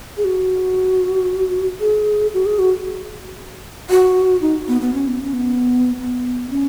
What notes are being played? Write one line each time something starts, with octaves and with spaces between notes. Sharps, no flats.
G#4
F#4
G#4
F#4
G#4
F#4
F#4
D#4
B3
B3
C#4
B3
C#4
B3
B3
C#4